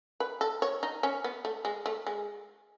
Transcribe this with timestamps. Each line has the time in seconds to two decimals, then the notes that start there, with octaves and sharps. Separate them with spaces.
0.20 B4
0.41 A4
0.62 C#5
0.83 D#4
1.03 C#4
1.24 B3
1.45 A3
1.65 G#3
1.86 A3
2.07 G#3